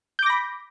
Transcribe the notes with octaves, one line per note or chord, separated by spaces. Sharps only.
B5 D6 G6 A#6